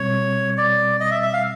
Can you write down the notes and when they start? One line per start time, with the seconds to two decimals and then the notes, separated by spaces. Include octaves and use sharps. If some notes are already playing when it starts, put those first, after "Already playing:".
Already playing: B2 G3 C4 C#5
0.58 D5
1.00 D#5
1.11 E5
1.23 E5
1.33 F5